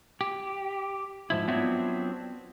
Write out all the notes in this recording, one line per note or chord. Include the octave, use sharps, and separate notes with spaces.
G4
G#2 F3 E4
F#3 B3 C4 D4 F4 E5